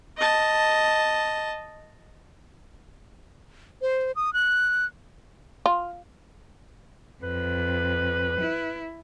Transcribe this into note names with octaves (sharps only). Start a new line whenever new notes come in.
D#5 A5
C5
D#6
F#6
F4
F2 B4
E4